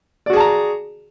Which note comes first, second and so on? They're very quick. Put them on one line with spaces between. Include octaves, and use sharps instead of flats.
D5 F#4 G#4 A5 A#5